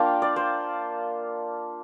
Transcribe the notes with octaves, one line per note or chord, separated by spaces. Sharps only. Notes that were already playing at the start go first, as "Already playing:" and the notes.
Already playing: A#3 D4 F4 F5 G5
D5
C5